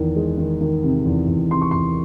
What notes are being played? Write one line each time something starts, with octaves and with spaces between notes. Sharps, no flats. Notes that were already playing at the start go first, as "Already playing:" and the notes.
Already playing: E2 D#3
G#3
D#3
D#3
C3
E2
E2
C3 C6
C#6
E2 C6